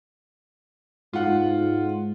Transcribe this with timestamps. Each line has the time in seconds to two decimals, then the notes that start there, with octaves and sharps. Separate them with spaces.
1.13 G#2 F4 F#5